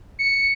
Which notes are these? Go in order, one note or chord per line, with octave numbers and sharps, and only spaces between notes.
C#7